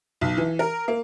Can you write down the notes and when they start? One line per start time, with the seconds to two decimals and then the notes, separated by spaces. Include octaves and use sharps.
0.21 B1
0.37 E3
0.59 A#4
0.88 A#3